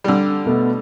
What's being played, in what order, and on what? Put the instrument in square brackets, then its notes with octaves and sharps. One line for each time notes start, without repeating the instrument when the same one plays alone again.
[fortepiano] D3 G3
[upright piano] B2 A3 B3